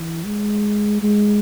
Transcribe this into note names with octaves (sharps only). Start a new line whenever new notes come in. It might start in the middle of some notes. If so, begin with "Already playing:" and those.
Already playing: E3
G#3
G#3